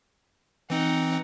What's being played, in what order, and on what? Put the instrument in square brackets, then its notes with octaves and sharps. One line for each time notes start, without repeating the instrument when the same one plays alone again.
[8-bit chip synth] E3 C4 [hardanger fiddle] D#4 F#5